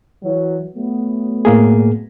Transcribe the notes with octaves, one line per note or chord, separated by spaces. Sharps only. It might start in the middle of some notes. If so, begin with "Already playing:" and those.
E3 F#3
F#3 A3 B3
A2 A#3 G#4